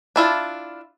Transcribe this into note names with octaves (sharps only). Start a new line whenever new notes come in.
D4 E4 F4